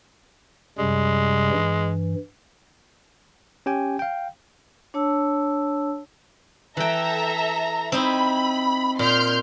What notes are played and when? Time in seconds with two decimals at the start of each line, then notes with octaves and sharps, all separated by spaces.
0.79 F#2 C3 G3 G#3
1.52 G2 E3
3.66 C#4 G4 G5 G#5
3.99 F5 G5
4.94 D4 C#5 A5 E6
6.77 E3 A4 E5 G5 A#5
7.92 C4 D#4 E4 B5
8.99 A#2 C6 F6 G6